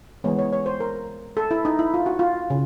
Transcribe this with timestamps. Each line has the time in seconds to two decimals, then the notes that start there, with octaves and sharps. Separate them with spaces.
0.24 E3 G#3 B3 C#5
0.39 C#5
0.53 C#5
0.66 C5
0.80 A#4
1.37 A4
1.51 E4
1.65 D#4
1.79 E4
1.94 F4
2.06 F#4
2.19 F4
2.50 C#3